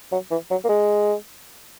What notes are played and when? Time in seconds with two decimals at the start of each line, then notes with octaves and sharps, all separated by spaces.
0.12 F#3
0.31 E3
0.50 F#3
0.64 A#3
0.69 G#3